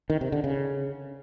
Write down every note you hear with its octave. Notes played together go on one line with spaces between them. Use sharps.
D#3
C3
D3
C#3